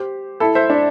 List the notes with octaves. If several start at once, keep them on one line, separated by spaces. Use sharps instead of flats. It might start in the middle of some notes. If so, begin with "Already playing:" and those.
Already playing: G4 C5
E4 A4
C5 E5
D4